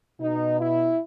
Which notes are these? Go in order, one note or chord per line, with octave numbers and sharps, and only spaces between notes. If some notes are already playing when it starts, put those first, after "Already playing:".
B2 D#4
E4